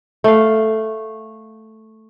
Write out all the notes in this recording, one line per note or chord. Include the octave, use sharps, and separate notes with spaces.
A3 F5